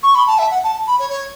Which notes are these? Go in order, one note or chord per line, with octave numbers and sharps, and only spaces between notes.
C#6
B5
A5
E5
F#5
A5
B5
C#5
C#5